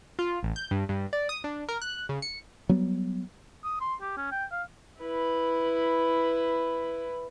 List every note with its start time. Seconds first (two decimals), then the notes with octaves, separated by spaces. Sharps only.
0.19 F4
0.43 A1
0.56 G6
0.71 G2
0.89 G2
1.13 D5
1.29 D#6
1.44 D4
1.69 A#4
1.82 F#6
2.09 C#3
2.22 C#7
2.69 F#3 G3 B3
3.65 D#6
3.81 C6
4.02 G4
4.17 C#4
4.32 G5
4.51 F5
4.99 E4 B4